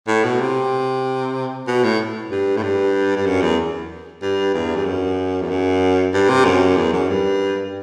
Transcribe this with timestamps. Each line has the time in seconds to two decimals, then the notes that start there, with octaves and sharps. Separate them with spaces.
0.08 A2
0.24 B2
0.40 C3
1.67 B2
1.84 A2
2.31 G2
2.57 A2
2.63 G2
3.16 G2
3.26 F#2
3.42 E2
4.22 G2
4.54 E2
4.76 G2
4.85 F#2
5.41 E2
5.49 F#2
6.13 G2
6.29 C3
6.45 F#2
6.76 E2
6.92 F#2
7.09 G2